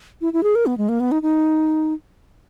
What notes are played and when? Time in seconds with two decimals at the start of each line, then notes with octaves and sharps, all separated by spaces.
0.21 E4
0.33 E4
0.43 G#4
0.55 A#4
0.66 B3
0.78 G#3
0.89 A#3
1.00 B3
1.12 D#4
1.22 D#4